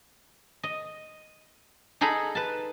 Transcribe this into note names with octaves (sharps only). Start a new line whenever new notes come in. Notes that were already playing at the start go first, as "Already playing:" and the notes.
D#5
D#4 G#4 A4 A#5 B5
B4 A5